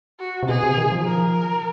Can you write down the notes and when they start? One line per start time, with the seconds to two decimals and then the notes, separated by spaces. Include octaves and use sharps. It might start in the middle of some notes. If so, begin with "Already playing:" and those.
0.20 F#4
0.43 C3
0.48 B2 G#4
0.63 C3
0.78 D#3
0.92 F3
1.06 A#4